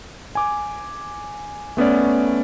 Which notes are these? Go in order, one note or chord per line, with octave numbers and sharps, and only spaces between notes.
G#5 D6
A3 B3 C#4 D5